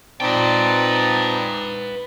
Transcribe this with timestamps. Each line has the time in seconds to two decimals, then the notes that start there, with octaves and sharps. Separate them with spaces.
0.20 A#2 C4 D#4 B4 D5 G5 A5